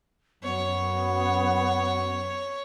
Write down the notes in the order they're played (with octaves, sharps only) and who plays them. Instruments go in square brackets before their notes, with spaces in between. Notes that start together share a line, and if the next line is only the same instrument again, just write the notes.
[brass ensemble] F#2 [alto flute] B3 [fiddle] C#5